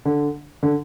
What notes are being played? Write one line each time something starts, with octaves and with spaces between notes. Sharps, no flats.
D3
D3